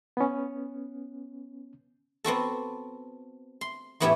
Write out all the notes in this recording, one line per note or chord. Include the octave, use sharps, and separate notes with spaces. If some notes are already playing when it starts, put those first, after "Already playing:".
B3 C#4
B3 C4 F#4 A4
C6
E2 A2 B3 E4 G4 C#5